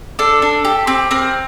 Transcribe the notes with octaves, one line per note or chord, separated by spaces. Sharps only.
D4 A4
D4
G4
C4
C4 A#4